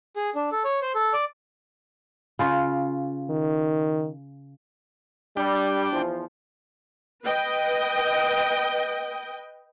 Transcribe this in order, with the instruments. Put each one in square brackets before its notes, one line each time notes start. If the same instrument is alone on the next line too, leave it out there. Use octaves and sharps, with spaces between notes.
[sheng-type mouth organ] G#4
D4
A4
C#5
C5
A4
D5
[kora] C#3 F4
[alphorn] D#3
[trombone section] G3 [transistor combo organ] D4 G5
[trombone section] E2 F3
[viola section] B4 D#5 G5